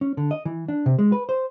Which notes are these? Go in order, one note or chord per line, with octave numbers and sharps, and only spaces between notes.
C#4
D3
D#5
E3
D4
C3
G#3
B4
C5